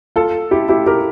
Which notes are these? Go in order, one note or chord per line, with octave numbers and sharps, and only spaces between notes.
F4 A4
E4 G4
E4 G4
G4 A#4